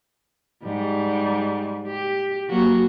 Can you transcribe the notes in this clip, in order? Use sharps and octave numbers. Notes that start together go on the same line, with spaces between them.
G#2 G3
G4
F#3 A#3 F#4